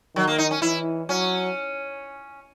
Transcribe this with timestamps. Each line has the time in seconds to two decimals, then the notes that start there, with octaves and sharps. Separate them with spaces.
0.15 D#3 F#3
0.27 A#3
0.38 D#4
0.51 C#4
0.62 E3 E4
1.09 F#3 C#4